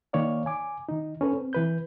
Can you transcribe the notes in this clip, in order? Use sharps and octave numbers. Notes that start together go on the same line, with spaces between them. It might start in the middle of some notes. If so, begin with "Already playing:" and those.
D#3 A#3 C#5 D5 F5
G#5 D6
D#3 D#4
C#4 A4 B4
C4
E3 B4 G6